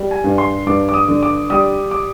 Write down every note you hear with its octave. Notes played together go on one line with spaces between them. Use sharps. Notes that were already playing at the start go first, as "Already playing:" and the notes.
Already playing: G3
G#5
G2
C6
G2 D6
D6
D#6
D3
D6
G3 D#6
D6